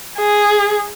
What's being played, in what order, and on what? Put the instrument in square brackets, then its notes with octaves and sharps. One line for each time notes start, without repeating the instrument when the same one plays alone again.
[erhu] G#4